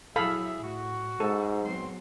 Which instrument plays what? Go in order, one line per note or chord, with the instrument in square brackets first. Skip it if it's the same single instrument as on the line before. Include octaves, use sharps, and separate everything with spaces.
[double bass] F#3 E4 [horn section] G#4 E5 [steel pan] A4 F5 B5
[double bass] A2 [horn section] F#4
[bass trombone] G#2 [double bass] G#3 [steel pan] A4
[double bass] F#3 B3 [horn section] C4 C6